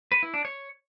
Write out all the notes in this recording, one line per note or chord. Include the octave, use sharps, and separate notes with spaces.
B4
E4
D4
C#5